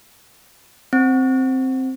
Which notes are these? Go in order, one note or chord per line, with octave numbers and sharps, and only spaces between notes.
C4